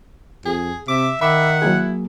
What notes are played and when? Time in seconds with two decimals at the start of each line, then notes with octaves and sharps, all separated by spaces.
0.46 F2 G#4
0.88 C3 E5 D6
1.21 D#3 E5 F#5 B5 D6 E6
1.62 F#3 A#3 E4 G#4